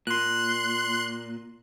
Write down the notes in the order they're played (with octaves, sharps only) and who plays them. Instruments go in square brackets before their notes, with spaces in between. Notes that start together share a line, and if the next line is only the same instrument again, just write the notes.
[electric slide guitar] A#2 [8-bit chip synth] C6 F#6